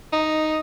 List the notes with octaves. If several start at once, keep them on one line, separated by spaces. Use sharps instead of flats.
D#4